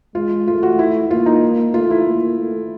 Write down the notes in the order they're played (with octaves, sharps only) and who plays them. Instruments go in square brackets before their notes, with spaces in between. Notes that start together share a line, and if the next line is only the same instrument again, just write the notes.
[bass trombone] G#3 [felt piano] F4
[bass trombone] A3 [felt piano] F4
[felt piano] F#4
E4
[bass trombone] A#3 [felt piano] F4
[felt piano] D#4
[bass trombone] A3 [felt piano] F4
[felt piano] E4
[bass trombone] A#3
A3